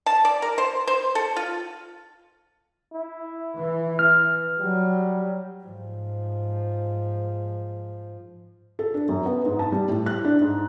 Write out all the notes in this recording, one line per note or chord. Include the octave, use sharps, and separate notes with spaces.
A5
D5
A#4
C5
C5
A4
F4
E4
E3
F6
F#3 G3
G#2 F3
A4
D4
F#2
B3
G#2
A5
G3
A2
F#6
D4
G#2